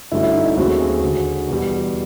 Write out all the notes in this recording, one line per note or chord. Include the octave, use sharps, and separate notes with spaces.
G2 D3 F#3 A3 C#4 E4
E4
D#4
E4
D#2 C#3 F#3 A3 C4 F#4
G#4
D2 D3 F#3
E2 B2 G3